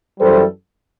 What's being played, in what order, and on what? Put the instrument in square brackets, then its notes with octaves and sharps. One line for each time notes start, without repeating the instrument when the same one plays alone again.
[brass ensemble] F#2 E3 G3 A4 C5